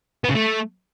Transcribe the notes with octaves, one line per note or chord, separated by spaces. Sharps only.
B3
C#3
A3